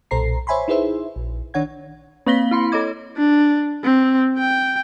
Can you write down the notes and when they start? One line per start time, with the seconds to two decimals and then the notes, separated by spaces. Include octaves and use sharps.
0.11 B1 A#2 A4 C5 A#5 C7
0.47 C5 C#5 E5 G#5 B5 C6
0.68 D#4 E4 G#4 B4 C5 E5
1.16 A#1
1.54 D#3 D4 C#5 F#5 G#6
2.26 A#3 C4 F5 A#6 B6 G7
2.51 E4 B5 C6
2.72 A4 C#5 D#5 D6 G#6
3.17 D4
3.84 C4
4.39 G5